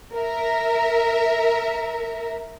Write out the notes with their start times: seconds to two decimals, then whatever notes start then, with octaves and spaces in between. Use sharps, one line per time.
0.15 A#4 E5